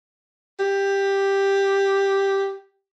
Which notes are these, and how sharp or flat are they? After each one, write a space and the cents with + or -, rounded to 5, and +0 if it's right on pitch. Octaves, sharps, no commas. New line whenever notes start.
G4 +5